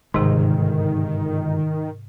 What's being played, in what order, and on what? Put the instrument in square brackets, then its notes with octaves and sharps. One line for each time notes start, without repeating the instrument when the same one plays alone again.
[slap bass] G1 G#3 [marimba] G#2 C3 [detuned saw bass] D#3